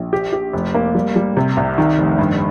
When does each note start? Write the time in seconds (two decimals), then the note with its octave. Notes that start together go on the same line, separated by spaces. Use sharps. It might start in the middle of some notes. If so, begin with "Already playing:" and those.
Already playing: A#1
0.13 G4
0.33 G4
0.53 F1
0.74 A#3
0.95 G3
1.16 G3
1.37 C3
1.57 C2
1.78 D#3
1.98 F1
2.19 G2